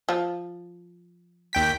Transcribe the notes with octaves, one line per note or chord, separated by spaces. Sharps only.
F3
D#2 G5 B6